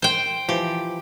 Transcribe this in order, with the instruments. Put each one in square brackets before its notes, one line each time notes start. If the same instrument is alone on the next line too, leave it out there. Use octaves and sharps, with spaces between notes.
[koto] C5 G5
[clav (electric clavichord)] E3 F3 [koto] G4